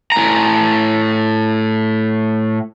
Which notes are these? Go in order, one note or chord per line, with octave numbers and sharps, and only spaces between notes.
A2 A#5